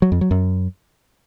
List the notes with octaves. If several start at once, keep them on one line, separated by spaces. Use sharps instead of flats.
F#3
F2
F#3
F#2